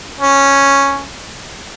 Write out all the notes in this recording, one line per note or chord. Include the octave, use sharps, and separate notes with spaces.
C#4